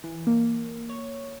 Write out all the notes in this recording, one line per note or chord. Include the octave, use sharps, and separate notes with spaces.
E3
A#3
C#5